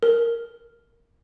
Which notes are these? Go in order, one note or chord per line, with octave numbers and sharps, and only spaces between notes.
A#4